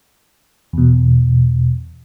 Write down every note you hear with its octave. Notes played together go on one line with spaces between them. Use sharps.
E2 B2